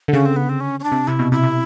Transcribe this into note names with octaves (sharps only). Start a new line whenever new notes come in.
D3
C#3 C#4
C4
B3
C4
C#4
C#4
D4
C3
C3 E4
B2
C3 E4
C3